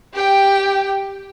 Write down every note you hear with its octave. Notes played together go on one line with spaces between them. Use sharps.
G4 G5